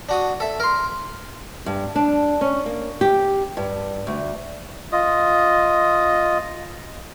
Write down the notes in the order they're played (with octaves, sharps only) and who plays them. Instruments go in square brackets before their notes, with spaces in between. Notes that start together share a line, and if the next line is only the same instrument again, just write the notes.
[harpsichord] D4 F#4 D#6
A4 E5
A#4 C6
[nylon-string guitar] G2
D4
C#4
A#3
G4
G2
D2
[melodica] F4 D#5